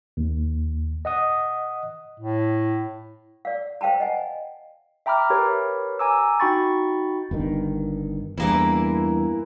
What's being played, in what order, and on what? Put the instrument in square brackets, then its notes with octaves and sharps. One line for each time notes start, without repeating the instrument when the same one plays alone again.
[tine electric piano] D#2
D#5 F#5 D#6
[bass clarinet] A2
[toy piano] D5 F5
C5 F5 G5 A5 A#5
D#5 F#5 G#5
[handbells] E5 G5 A#5 B5 D6 F6
G4 A#4 B4 C#5 B5
G#5 A#5 D6 E6
D#4 F#4 G5 B5 C#6 A6
[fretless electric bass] G1 G2 D#3
[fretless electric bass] E2 G2 [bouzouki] E3 A#3 E4